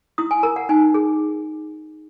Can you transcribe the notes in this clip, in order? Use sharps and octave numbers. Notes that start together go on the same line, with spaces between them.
E4 D#6
G#5
A#4 A#5
F#5
D#4 G#5
G#4